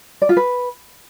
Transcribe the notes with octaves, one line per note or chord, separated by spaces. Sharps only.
D5
F4
B4